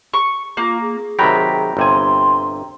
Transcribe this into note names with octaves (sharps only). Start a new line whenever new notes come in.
C#6
A#3 F4
G#4
C3 D#3 F#3 G5 A#5 B5
G1 C3 G#5 C6